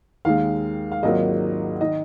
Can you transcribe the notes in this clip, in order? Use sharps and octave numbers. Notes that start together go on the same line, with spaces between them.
D#2 D#3 G#3 F5
F5
G#1 G#2 F#3 A#3 F4 D#5
D#3 D#5